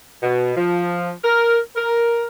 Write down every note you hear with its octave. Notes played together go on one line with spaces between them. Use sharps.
B2
F3
A#4
A#4